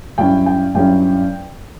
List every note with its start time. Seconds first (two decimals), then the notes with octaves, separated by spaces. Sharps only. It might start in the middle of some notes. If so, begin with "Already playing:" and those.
0.18 G2 F#3 C#4 E4 G5
0.46 G5
0.75 G2 F#3 C#4 E4 G5